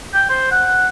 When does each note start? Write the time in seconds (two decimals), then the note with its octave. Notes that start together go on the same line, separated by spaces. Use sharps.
0.14 G5
0.30 C5
0.51 F#5